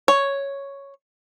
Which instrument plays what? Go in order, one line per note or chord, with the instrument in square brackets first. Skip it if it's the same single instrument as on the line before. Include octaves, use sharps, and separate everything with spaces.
[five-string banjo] C#5